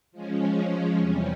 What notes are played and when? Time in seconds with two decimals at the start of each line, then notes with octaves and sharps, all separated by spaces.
0.12 F3 G#3 C#4
0.97 E2 C3 G3 C#4